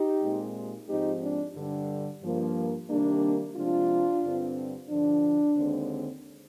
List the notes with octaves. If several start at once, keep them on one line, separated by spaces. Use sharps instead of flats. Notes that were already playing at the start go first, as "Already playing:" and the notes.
Already playing: D#4 G4
A#2 G#3 C4
G#2 F3 G#3 C4 D#4 G4
D4
G2 D3 G3
G2 F3 A#3
C3 D#3 G3 A#3 D4
C3 F3 G#3 D4 F4
G2 D3 G3 C4
G2 D3 F3 D4
D#2 D3 G#3 C4